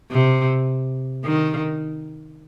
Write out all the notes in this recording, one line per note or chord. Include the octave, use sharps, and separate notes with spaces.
C3
D#3